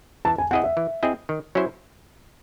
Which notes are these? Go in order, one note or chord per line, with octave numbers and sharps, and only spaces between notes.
E3 A5
G#5
C4 E4 G#4 D#5 F#5
E5
E3
C4 E4 G#4 D#5
D#3
F#3 C#4 E4 C5